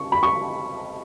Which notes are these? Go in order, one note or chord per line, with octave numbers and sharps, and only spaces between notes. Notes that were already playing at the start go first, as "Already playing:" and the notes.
Already playing: C#6
B5
C#6